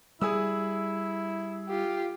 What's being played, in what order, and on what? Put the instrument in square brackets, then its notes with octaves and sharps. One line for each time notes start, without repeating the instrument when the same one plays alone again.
[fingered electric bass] G3 [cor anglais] E4 [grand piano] G#4 D#6 E6
[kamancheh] F4 G4